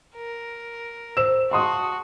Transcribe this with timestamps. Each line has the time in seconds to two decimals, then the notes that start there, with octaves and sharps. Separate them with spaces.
0.16 A#4
1.17 C5 E6 E7
1.51 F#4 A5 C6 D#6